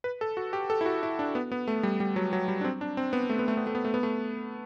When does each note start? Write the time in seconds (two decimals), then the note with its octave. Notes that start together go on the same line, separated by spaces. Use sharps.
0.04 B4
0.21 A4
0.37 F#4
0.53 G4
0.70 A4
0.81 E4
0.86 F#4
1.03 E4
1.19 D4
1.35 B3
1.52 B3
1.68 A3
1.83 G3
2.00 G3
2.16 F#3
2.33 F#3
2.48 G3
2.61 D4
2.64 C4
2.81 D4
2.97 C4
3.13 B3
3.30 A3
3.39 B3
3.48 A3
3.57 B3
3.67 A3
3.75 B3
3.85 A3
3.94 B3
4.03 A3